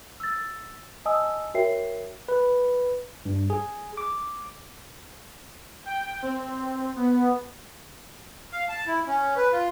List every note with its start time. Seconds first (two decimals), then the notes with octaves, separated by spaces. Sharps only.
0.20 E6 A6
1.06 D#5 G#5 A5 D#6 E6
1.54 F#4 A#4 C#5 E5 G5 C7
2.28 B4
3.25 G2
3.50 G#4
3.97 D6
5.86 G5
6.22 C4
6.96 B3
8.52 F5
8.69 A5
8.88 E4
9.07 C#4
9.37 B4
9.53 F4